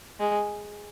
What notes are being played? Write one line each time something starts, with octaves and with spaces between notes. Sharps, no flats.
G#3